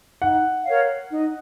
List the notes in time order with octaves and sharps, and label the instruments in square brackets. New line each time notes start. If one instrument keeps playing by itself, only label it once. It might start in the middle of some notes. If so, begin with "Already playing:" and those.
[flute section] D#4 [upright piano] F#5
[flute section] A#4 C#5 F5
D#4